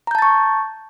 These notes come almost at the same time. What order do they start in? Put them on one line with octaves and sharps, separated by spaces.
A#5 G6 A5 A6 C#6